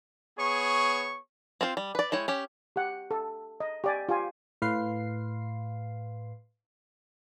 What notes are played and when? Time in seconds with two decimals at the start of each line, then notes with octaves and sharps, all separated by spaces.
0.38 B3 G#4 C#5 C#6
1.61 C4 F4 C5
1.77 G3
1.95 B4 D5
2.12 G#3 E4 C#5 G5
2.28 C#4 G4
2.76 G4 F#5
3.11 A4
3.60 D#5
3.84 G4 D5 G#5
4.09 F4 G4 G#5
4.62 A2 B4 F5 C6 C7